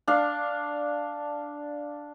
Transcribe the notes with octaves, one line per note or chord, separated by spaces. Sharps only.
D4 F5